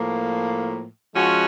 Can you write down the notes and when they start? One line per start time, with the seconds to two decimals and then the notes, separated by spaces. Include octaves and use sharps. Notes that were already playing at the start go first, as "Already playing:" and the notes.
Already playing: A2 F3 A#3
1.14 F3 G#3 C#4 F#4